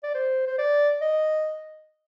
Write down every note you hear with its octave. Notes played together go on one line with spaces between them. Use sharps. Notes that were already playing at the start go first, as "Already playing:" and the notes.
D5
C5
C5
D5
D#5